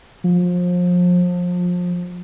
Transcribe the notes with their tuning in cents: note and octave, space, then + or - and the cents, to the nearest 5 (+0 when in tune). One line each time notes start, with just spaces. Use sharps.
F3 +30